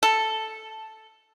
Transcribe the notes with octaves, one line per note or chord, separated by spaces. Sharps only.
A4